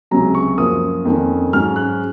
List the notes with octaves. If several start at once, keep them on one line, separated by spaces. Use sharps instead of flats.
C#2 C3 F#3 C#4 A#5
C#6
F#2 F3 A#3 D#6
F2 D#3 A#3 C#4
G#2 F#3 C#4 F6
F#6